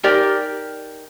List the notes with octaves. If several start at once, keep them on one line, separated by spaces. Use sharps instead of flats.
D#4 G4 A#4 D5